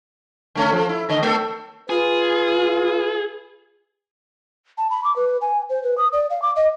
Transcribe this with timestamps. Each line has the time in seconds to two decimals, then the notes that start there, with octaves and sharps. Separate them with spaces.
0.55 D3 A3 C#4
0.72 F3
0.89 E4
1.09 A2 D3 D#5
1.23 A3 A4
1.90 F4 G#4 B4
4.78 A5
4.90 B5
5.04 D6
5.16 B4
5.41 G#5
5.69 C5
5.84 B4
5.98 D#6
6.13 D5
6.30 F5
6.42 D6
6.56 D#5